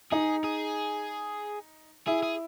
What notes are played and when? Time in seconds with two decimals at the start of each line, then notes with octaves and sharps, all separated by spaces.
0.12 D#4 G#4
0.44 G#4
2.07 E4 G#4
2.23 G#4